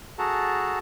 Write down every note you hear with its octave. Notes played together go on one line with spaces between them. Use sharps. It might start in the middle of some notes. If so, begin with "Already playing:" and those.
F#4 G#4 A4 F#5 A5 A#5